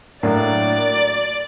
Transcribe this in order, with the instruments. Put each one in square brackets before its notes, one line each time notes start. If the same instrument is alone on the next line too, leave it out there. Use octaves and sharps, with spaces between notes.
[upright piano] A2 F#3 A#3 D4 [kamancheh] D5